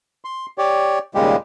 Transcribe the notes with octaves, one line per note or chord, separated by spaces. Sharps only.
C6
G4 C#5 D5
D#2 A#2 C#3 G3 G#3 G4